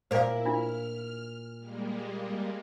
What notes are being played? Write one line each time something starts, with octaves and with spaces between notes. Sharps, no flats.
A#2 E4 A#4 C5 D5 F5
D4 E4 F4 F6
G3 G#3 A#3